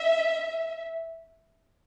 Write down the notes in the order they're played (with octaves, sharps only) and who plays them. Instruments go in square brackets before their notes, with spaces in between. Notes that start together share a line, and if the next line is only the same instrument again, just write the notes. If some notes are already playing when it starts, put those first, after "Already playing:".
Already playing: [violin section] E5